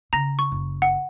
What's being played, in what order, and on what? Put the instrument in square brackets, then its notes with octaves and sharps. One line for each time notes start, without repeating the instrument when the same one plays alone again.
[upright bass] C#3 [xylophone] A#5 A#6
[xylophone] C#6
[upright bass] F#1
[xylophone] F#5